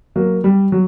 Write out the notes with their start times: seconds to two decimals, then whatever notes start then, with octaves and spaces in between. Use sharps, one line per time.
0.16 F#3 A#3
0.44 G3
0.72 F#3